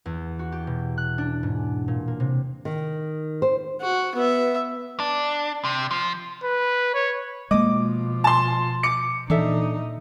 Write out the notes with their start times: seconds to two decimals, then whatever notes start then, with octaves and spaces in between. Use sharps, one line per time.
0.06 E2
0.39 F#4
0.52 G4
0.67 B2
0.98 F#6
1.18 D4
1.43 G#2
1.88 A#2
2.08 A#3
2.20 C3
2.65 D#3
3.42 C5
3.81 F#4
4.15 B3 E5
5.00 D4
5.64 C3
5.91 F3
6.43 B4
6.94 C#5
7.51 B2 F3 G#3 A#3 D#5 D6
8.24 A5 C6
8.83 D6 C#7
9.30 A#2 E3 D4 D#4 A4 E5